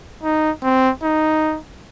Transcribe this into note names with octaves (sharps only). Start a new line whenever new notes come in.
D#4
C4
D#4